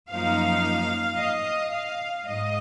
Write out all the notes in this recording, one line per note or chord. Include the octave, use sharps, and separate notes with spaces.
F#2 F3 A#3 D#4 F5
D#5
F5
G#2 D#5